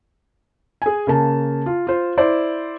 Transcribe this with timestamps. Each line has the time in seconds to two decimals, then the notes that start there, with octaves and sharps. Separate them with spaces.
0.82 G#4 G#5
1.07 C#3 A#3 A5
1.66 F4
1.87 F4 C5
2.17 E4 C5 D5